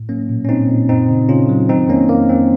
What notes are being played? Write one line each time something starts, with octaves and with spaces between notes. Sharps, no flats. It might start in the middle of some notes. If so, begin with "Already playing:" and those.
Already playing: A2
F#3 A#3 C#4
A#2
C#4
A#2 C4 D#4
A#2
F#2 C4 D#4
C#3
C#3 C#4 F4
F#3
D#3 C4 D#4
F2 A#3 C#4
F2 A#3
F2 C4